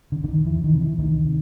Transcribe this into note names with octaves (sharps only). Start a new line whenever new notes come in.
D3
C3
D3
D#3
E2 E3
D#3
C3
E3
D2 D#3
C3